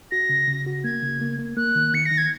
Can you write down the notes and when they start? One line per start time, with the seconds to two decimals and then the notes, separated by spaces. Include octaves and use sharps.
0.11 F#4 A#6
0.29 C#3
0.48 C#3
0.66 F#4
0.84 A#3 G#6
1.02 C#3
1.21 A#3
1.39 A#3
1.57 A#3 F#6
1.75 D#3
1.93 D#3 C#7
2.06 A#6
2.12 D#3
2.18 G#6